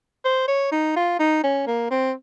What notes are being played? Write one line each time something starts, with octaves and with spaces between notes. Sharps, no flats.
C5
C#5
D#4
F4
D#4
C#4
A#3
C4